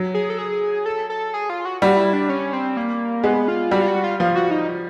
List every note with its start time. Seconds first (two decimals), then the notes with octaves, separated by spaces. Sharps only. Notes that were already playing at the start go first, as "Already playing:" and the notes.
Already playing: F#3
0.14 G#4
0.30 A4
0.38 G#4
0.86 A4
1.10 A4
1.34 G#4
1.50 F4
1.65 F#4
1.82 G3 F#4
1.97 E4
2.13 D4
2.29 C#4
2.53 C4
2.77 A#3
3.24 G#3 B3
3.48 F4
3.71 G3 F#4
3.82 F4
3.88 F#4
4.04 F4
4.19 F3 F4
4.36 F#4
4.51 D#4